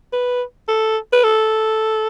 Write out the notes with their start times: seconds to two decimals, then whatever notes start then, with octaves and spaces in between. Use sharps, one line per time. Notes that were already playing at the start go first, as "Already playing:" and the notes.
0.13 B4
0.68 A4
1.13 B4
1.24 A4